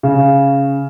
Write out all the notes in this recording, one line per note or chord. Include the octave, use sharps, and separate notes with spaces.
C#3